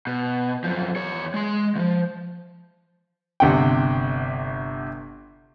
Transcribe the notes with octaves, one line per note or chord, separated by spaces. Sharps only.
B2
F#2 F3
E2 C#5
G#3 C6
D2 F3
G1 C3 F#5 G5